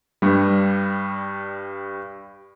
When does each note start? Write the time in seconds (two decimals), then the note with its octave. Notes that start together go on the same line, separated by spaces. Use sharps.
0.22 G2 G3